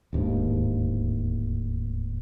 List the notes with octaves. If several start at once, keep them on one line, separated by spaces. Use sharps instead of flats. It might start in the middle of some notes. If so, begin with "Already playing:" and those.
D1 D#2 G#2 A#3